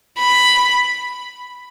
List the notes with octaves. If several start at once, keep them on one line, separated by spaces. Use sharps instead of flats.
B5